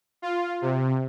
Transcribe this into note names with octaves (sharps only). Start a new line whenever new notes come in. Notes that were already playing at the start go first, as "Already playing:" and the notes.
F4
C3